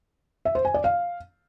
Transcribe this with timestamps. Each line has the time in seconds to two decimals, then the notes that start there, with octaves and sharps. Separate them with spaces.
0.45 E5
0.55 C5
0.65 G#5
0.74 D5
0.84 F5